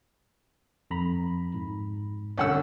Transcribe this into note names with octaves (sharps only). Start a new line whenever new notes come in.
F2 A#5 B5
G#2
C2 D3 C#4 C#5 F#5 E6